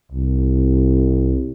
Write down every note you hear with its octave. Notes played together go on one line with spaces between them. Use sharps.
C2